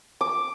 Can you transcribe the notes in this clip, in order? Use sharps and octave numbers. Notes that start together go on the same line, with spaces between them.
D6